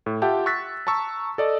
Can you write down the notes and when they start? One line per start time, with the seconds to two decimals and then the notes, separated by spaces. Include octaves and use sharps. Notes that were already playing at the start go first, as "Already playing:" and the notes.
0.06 A2
0.22 F4 G4 E5 F#5 G5 A5
0.46 C#6 E6 F#6 A6 B6
0.87 A5 A#5 C#6 E6
1.38 A4 D5 D#5 A5